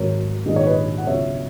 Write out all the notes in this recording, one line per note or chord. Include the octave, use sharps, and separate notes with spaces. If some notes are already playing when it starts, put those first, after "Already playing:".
Already playing: G#1 G#2 D#3 F#3 A#4 C#5
A#1 G#2 D#3 G#3 D#5
C#5
B4 D#5
F#5
C#2 B2 F#3 C#5 E5